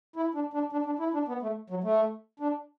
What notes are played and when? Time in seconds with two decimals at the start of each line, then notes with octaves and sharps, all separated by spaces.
0.16 E4
0.34 D4
0.54 D4
0.72 D4
0.86 D4
0.99 E4
1.14 D4
1.28 B3
1.42 A3
1.70 F#3
1.84 A3
2.40 D4